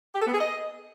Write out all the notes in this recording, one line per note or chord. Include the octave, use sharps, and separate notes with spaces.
G4
A4
B3
G#4
D#5